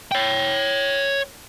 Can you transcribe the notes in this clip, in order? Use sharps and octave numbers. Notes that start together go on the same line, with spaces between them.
C#5 G5